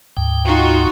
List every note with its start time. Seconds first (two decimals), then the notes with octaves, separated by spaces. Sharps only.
0.17 D2 G#2 G5
0.45 D#4 F4 F#4